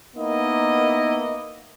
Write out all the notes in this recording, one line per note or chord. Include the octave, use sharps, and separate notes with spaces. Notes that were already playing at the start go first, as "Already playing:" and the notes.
A#3 B3 D#4 E4 D#5